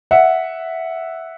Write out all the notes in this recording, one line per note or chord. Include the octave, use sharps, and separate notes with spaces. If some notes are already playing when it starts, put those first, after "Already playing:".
E5 F#5